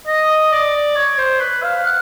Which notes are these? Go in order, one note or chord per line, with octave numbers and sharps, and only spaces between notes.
D#5
D5
C#5
C5
B4
F5
F#5